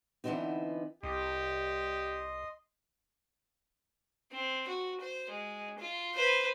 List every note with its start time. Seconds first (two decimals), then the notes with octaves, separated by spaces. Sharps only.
0.24 D3 E3 G3 B3 C4 D#4
1.03 C2 G4 D#5 C6
4.32 C4
4.68 F#4
5.00 C5
5.30 G#3
5.79 F4
6.14 B4 C5